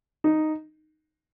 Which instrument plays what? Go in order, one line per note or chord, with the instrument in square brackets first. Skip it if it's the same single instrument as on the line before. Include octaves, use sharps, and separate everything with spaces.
[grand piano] D#4